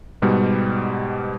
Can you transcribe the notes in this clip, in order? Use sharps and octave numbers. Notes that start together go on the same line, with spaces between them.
G#2 B2 G3